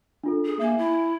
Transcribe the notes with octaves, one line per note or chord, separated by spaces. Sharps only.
D4 F4 A4
G#4
A#3 E5 G#5
E4